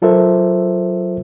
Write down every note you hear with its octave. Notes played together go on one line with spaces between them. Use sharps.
F#3 F4 A4 A#4 C5 E5